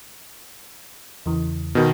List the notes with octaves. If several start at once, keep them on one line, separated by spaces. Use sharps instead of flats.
E2 C#3 E3
B2 D#3